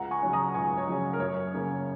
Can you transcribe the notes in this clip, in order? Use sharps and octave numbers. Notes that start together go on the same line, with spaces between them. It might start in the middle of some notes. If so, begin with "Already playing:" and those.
Already playing: C#2 F#5 A#5
G#5 C#6
C#3 F#3 C#4
A#5 D#6
C#2 G#5 C#6
C#5
C#3 F#3 C#4
A#4
F#2 C#5
C#3 A#3 C#4